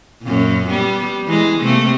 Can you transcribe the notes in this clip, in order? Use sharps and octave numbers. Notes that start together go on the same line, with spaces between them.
F#2 A#2
G3 B3
E3 G#3
C3 A3 A#3